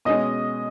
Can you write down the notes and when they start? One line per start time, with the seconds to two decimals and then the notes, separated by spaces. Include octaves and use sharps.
0.05 B2 G#3 C#4 D#5 D#6